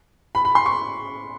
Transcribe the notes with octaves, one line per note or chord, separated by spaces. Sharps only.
B5
B5
C6
C#6